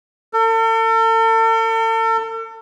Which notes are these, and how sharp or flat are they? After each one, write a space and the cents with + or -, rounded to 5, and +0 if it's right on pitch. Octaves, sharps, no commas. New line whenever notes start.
A4 +40